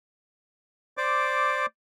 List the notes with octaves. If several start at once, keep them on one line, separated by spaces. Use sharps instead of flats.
C5 D5 D6